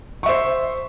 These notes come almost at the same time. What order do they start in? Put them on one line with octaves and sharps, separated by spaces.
C#6 E5 C5